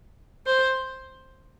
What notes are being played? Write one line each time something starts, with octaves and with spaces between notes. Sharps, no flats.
C5